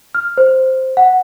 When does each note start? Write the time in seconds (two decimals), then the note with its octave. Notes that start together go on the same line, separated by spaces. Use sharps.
0.15 F6
0.38 C5
0.97 F#5